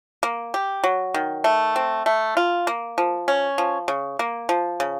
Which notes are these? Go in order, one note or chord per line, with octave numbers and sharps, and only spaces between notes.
A#3
G4
F#3
D#3
A3
C4
A3
F4
A#3
F3
C#4
F3
C#3
A#3
F3
C#3